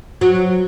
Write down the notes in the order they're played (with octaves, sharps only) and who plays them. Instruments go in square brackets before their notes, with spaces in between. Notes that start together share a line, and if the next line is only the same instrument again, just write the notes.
[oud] F#3